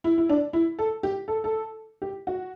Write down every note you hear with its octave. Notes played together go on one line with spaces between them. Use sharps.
E4
E4
D4
E4
A4
G4
A4
A4
G4
F#4